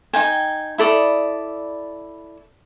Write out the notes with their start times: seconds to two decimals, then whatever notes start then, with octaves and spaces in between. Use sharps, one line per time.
0.13 D#4 G5 G#5
0.78 E4 A4 D5 D#6